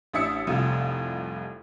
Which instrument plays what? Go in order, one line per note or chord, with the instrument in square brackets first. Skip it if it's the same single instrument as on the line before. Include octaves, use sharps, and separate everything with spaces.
[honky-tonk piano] A1 D4 E5 D#6 E6 C#7
F1 C2 F4